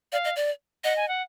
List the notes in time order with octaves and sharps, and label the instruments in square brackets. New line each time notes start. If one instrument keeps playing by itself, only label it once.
[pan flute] D5 [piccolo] F5
[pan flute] D#5
D5
[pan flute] D#5 [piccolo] F#5
[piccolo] G#5
F#5